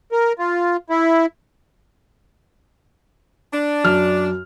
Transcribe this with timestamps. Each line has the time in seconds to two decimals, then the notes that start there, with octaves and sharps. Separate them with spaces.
0.12 A#4
0.39 F4
0.90 E4
3.53 D4
3.84 F#2 F6